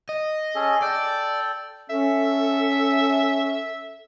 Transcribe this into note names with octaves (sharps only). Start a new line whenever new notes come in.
D#5
C#4 G#4 A4
A4 D5 G5
C#4 A4 E5